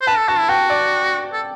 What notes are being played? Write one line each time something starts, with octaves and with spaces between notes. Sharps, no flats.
C5
B4 A5
A4
F#4 A5
E4
F#4 G5
D5
A4